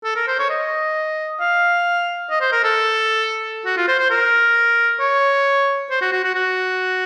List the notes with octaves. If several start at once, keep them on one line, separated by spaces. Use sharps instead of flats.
A4
A#4
C5
C#5
D#5
F5
D#5
C5
A#4
A4
F#4
F4
C5
C5
A#4
C#5
C5
F#4
F#4
F#4
F#4